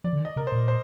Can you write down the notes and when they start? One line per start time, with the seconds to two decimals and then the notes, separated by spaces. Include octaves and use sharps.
0.04 F3 D5
0.13 D3
0.20 D#3
0.25 D#5
0.36 C3 A#4
0.47 C5
0.52 A#2
0.68 C5